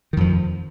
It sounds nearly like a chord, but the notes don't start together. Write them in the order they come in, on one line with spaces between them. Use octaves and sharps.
D#3 F2 F3